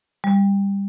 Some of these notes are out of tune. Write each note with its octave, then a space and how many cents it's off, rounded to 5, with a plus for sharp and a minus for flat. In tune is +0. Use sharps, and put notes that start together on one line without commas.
G3 +20